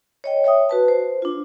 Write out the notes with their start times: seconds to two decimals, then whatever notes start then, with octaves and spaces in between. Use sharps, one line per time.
0.24 C#5 D#5 G5
0.44 C#5 E5 G5 D#6
0.69 F#4 B4 A5
0.88 C5
1.22 D4 F4